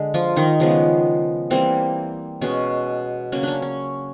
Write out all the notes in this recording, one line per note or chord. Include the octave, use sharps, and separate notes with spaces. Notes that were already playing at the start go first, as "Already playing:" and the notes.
Already playing: D3 G#3
F3 F4
D#3 D#4
C#3 F3 G#3 B3
E3 G3 A#3 C4
B2 G#3 B3 C#4
C#3 F#3 A#3 C#4
C#4 D4
C#4